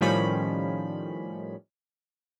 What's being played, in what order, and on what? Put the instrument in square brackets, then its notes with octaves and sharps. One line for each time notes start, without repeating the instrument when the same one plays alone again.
[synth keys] A2 D#3 F3 G3 C#4 B5